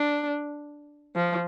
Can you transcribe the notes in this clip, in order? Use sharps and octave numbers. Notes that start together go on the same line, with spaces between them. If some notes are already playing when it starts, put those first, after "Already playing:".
Already playing: D4
F3